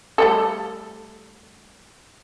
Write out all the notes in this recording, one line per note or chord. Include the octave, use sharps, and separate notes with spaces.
G3 A3 A4